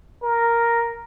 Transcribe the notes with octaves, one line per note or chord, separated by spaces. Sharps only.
A#4